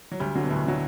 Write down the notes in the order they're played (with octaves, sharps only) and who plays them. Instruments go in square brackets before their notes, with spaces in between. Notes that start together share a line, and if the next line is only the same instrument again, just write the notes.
[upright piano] F#3
[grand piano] D2 [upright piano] G3
[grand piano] D3 F#3
[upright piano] B2
[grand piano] D2 [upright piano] A2
[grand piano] D3 F#3